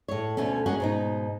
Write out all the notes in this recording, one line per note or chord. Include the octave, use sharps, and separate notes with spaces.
A2 C#5
D2 B2 A3 C#4
G#3 A#3 C#4 F#4
G#2 B2 D#4